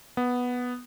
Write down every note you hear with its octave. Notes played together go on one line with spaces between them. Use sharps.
B3